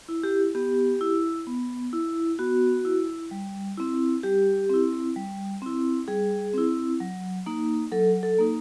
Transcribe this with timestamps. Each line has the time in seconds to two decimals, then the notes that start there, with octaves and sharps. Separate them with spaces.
0.09 E4
0.24 G4
0.55 B3 G4
1.01 E4
1.47 B3
1.93 E4
2.39 B3 F#4
2.85 E4
3.31 G3
3.78 C4 E4
4.23 G3 G4
4.70 C4 E4
5.16 G3
5.62 C4 E4
6.08 G3 G#4
6.54 C4 E4
7.00 F#3
7.46 A#3 D#4
7.92 F#3 A4
8.23 A4
8.38 A#3 D#4